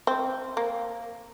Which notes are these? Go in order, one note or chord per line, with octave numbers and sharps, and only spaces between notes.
C4
A#3